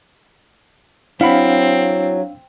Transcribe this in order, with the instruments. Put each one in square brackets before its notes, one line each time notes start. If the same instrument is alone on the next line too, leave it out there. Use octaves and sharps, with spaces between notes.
[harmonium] F#3 [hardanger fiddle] C4 [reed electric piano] D4 F5 [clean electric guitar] E4 F#5 B5